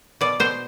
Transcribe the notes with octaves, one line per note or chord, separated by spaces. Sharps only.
B2 D5
B2 C5